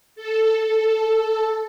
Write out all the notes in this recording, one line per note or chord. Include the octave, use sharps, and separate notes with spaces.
A4
A4